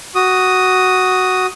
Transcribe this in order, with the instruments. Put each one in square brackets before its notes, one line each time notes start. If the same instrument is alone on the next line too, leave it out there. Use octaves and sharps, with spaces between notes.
[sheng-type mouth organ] F#4 D#6